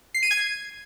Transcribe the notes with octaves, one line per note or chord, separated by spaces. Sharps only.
C7
D#7
G#6